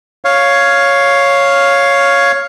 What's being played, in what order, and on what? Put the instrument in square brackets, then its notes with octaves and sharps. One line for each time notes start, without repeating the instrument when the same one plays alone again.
[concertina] C#5 F5